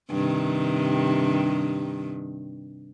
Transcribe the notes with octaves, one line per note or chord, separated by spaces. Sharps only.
G2 C3 D#3